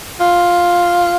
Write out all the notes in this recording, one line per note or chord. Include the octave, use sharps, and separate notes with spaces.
F4